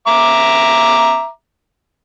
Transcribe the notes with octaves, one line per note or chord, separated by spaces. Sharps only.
E5 A#5 D6